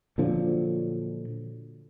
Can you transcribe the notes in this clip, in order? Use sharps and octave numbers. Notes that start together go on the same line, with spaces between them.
A#2 D3 F3 F#3